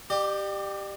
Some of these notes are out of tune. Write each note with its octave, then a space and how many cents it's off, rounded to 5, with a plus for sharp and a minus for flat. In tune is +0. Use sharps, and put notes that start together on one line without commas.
G4 +0 D5 +40